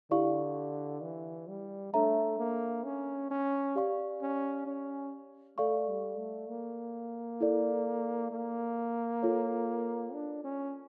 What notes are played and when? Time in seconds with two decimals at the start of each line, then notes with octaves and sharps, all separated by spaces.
0.11 D3 E4 G4 D5 F5 C#6
1.03 E3
1.48 G3
1.93 A3 D4 A4 C#5 E5 A#5
2.39 A#3
2.84 C#4
3.30 C#4
3.75 G4 D5 F5 C#6
4.22 C#4
4.66 C#4
5.58 A3 A4 D5 F5 C#6
5.89 G3
6.19 A3
6.49 A#3
7.40 E4 A4 D5
8.31 A#3
9.22 F4 A4 C#5
10.14 D4
10.44 C#4